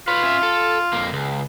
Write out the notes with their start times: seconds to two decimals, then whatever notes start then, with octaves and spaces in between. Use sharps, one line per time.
0.08 F4 B4 C#5
0.23 C#4 E5
0.43 A4
0.93 F2 A#3
1.13 C#2